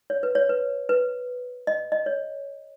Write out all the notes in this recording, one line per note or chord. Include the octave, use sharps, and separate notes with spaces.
C#5
B4
C#5
B4
B4
D#5
D#5
C#5